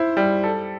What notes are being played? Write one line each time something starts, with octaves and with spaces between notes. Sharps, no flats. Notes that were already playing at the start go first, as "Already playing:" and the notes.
Already playing: E4 C5
G3
A4